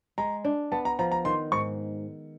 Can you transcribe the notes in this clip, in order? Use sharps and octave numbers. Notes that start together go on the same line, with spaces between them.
G#3 A#5
D4
B3 A5
A#5
F3 A#5
A#5
D#3 C6
G#2 C#6